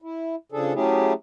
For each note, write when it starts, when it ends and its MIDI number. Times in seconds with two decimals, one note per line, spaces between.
0.02 0.35 64
0.52 0.74 49
0.52 0.74 53
0.52 0.74 62
0.52 0.74 68
0.52 0.74 69
0.74 1.13 54
0.74 1.13 57
0.74 1.13 61
0.74 1.13 64
0.74 1.13 67
0.74 1.13 68